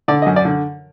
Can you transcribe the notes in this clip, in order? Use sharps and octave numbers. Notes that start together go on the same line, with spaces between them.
D3 D5
D#5
F#2
D5
D3